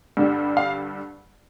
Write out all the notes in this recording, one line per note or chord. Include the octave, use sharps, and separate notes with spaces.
G2 D3 G3
F5